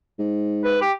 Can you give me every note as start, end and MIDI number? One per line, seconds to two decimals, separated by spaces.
0.19 0.84 44
0.64 0.77 71
0.82 0.92 67